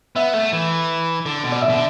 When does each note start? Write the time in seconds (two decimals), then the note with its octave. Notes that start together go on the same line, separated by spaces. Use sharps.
0.16 B3 E5
0.34 A3
0.53 E3
1.26 D3
1.44 B2
1.52 D5
1.62 E5
1.70 B2
1.74 D3